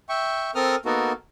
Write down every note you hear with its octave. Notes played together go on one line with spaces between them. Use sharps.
E5 G5 C#6
C4 A4 A#4 D#6 F6
A#3 B3 D#4 F#4 A4 A#4